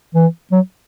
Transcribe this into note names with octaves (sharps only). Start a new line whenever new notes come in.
E3
F#3